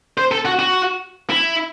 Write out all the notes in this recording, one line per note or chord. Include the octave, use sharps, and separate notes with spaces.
C5
A4
F#4
F#4
E4